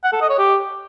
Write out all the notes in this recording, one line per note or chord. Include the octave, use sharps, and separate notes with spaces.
F#5
A4
D#5
C#5
G4